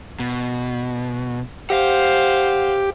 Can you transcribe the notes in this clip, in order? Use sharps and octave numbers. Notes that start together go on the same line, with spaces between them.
B2
G4 C5 F5 F#5